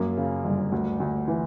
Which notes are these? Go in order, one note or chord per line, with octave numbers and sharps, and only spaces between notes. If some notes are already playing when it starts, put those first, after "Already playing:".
Already playing: F#2 A#3
C#3
G1
D2
D2
E3